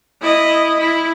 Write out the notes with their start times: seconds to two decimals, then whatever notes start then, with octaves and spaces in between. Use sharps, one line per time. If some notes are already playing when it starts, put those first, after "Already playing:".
0.22 E4 D#5
0.79 E4